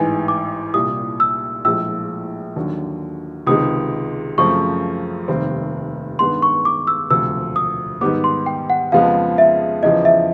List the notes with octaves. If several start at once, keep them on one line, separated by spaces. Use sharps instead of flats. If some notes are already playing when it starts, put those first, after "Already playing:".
Already playing: A1 G#2 E3 G#5
D6
C2 A#2 G3 D#6
E6
A#1 A2 F3 G#3 E6
D#2 D3 F#3
C#2 C3 D#3 G#3 D#6
F#2 C#3 F3 A3 C4 C#6
F1 D#2 D#3 G3 C4
G2 D#3 G#3 B3 C6
C#6
D6
E6
E1 D2 C3 F3 E6
D#6
G#2 D#3 G3 B3 D6
C6
G5
F#5
F2 C#3 F3 G#3 B3 F5
E5
E2 C#3 F3 D#5
E5